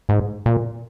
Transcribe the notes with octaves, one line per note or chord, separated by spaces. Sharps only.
G#2
A#2